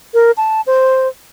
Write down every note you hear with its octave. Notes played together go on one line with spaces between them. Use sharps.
A#4
A5
C5